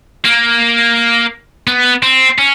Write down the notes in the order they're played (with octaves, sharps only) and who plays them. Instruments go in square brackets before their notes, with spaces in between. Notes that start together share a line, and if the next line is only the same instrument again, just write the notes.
[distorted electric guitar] A#3
B3
C4
C#4